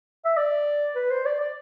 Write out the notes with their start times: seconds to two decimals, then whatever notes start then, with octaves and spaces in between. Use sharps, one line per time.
0.25 E5
0.37 D5
0.95 B4
1.11 C5
1.25 D5
1.40 D5